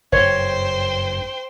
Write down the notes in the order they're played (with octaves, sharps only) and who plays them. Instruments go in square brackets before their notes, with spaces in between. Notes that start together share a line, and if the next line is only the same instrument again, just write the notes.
[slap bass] F#1 G2 [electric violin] C5 G5 [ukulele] C#5